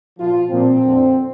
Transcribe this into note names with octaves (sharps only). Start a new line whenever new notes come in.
A#2 F3 F4
A#2 F3 C4
F2 D3 F3